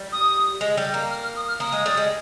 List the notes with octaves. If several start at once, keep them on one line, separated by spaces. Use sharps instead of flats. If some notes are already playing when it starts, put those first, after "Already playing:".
Already playing: G3
D#6
G#3
G3
A#3
F6
F6
D#6
F6
A#3 D#6
G#3
G3
G#3